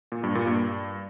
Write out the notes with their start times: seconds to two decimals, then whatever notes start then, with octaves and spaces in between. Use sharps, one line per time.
0.12 A#2
0.24 G2
0.35 A#2
0.47 G2